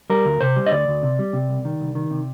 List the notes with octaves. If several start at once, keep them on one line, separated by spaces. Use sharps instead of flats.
G3 A#4
D2
C3 C5
G3
D#5
D2 D5
D2
C3
G3
C3
C2
D#3
C2
D#3
C3